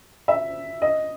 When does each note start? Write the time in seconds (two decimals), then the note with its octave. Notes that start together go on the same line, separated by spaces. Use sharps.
0.28 E5
0.82 D#5